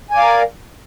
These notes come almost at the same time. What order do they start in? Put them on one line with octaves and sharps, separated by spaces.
G#5 D5 F5 A#4